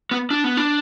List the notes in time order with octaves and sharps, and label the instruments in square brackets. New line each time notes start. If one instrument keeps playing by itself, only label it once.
[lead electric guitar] B3
D4
B3
D4